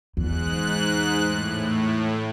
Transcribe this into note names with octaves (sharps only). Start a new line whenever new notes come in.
E2 G#2 F#6
A2